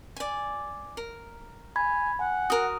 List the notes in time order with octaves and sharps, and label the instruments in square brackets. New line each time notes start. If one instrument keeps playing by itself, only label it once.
[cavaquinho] D5 G#5
A#4
[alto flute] G#5 [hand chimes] B5 G#6
[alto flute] F#5 [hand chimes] G#5
[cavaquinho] F#4 A#4 [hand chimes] D#6